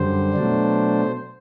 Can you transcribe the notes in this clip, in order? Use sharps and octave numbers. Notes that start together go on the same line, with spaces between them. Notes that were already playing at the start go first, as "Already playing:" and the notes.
Already playing: F#2 D3 G3 C5
B2 F#3 A3 D4